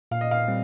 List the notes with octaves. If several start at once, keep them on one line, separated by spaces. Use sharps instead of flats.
A#2 F5
D#5
F5
G3 C4